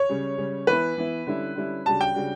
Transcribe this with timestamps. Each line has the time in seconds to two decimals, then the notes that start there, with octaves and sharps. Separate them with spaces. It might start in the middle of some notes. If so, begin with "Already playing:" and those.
Already playing: C#5
0.09 C#3 G3 C#4
0.38 C#3 G3 C#4
0.67 E3 B3 E4 B4
0.97 E3 B3 E4
1.27 D3 G3 C#4 E4
1.55 D3 G3 C#4 E4
1.86 C#3 G3 D4 F#4 A5
2.01 G5
2.15 C#3 G3 D4 F#4